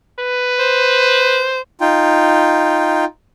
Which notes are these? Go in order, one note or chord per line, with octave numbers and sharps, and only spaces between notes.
B4
C5
D#4 F4 G5